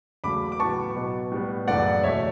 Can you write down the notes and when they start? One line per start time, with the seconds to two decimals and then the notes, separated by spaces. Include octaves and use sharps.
0.24 E2 C#3 F#3 A3 B5 D6
0.52 D6
0.60 A2 F#3 B3 A5 C#6
0.96 B2 F#3 B3
1.31 A2 G3 B3
1.67 F#2 C#3 E3 A3 D5 F#5
2.03 E2 B2 A3 C#5 E5